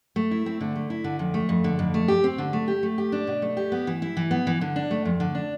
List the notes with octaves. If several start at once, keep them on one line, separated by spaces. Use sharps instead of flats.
A3
E4
C4
D3
A3
E4
D3
F2
A3
F2
D3
F2
A3
G4
C4
D3
A3
G4
A3
G4
D4
B2
A3
G4
B3
E3
E4
E3
B3
E3
D3
D4
A3
F2
D3
D4